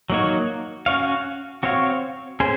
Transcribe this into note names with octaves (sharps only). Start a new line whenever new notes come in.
F#3 A#3 D#4 F#4 C#5
C#4 F#4 C#5 F5
C4 F#4 C#5 F5
C#4 G#4 C5